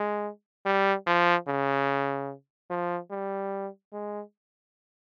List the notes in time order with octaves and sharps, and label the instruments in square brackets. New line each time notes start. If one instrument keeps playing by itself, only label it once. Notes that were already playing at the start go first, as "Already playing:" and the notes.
Already playing: [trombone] G#3
G3
F3
C#3
F3
G3
G#3